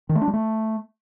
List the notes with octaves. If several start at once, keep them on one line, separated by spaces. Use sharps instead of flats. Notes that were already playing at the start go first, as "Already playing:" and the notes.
D#3
A3
D4
G3
A3